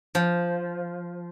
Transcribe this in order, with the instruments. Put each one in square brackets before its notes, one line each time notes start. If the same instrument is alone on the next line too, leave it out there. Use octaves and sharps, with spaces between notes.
[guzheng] F3